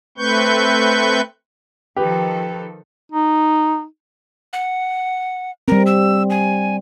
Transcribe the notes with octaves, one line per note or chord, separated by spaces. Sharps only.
A3 C4 B4 C#6 G6
D#3 F3 G4 A4 B4
D#4
F#5
G3 C4 A#4
E6
G#5